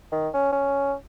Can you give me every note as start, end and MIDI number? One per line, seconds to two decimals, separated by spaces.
0.12 0.29 51
0.34 0.51 61
0.52 0.94 61